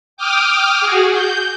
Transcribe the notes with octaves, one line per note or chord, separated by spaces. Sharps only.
G5 D6 D#6 F6
F#4 G#4
G6